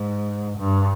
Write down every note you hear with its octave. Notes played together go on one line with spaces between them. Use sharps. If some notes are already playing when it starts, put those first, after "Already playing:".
Already playing: G#2
G2